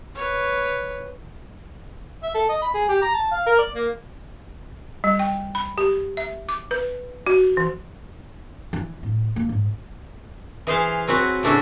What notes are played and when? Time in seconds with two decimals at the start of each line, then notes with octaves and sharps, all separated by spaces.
0.15 B4 C#5
2.23 E5
2.35 A4
2.49 D#5
2.62 B5
2.74 G#4
2.88 G4
3.02 A#5
3.14 A5
3.31 F5
3.46 A#4
3.58 D5
3.75 A#3
5.04 G3
5.19 G5
5.55 B5
5.78 G4
6.17 E5
6.49 D6
6.71 B4
7.27 F#4
7.57 E3
8.73 E3
9.03 A2
9.36 A#3
9.49 G#2
10.67 E3 G#4 C5 F5
11.07 F#3 C4 F#4 B4
11.43 A2 C#3 D4 E4 F#4